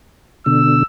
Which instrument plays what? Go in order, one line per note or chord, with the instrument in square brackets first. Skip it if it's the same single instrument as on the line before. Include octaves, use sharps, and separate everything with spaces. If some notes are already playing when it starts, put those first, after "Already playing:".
[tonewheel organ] B2 D3 [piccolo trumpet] E6